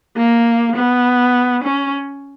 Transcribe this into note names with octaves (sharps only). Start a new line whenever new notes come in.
A#3
B3
C#4